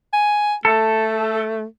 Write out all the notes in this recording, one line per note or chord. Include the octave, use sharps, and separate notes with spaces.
G#5
A3 A4